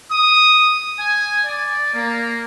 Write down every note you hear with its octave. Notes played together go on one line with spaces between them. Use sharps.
D#6
G#5
D5
A#3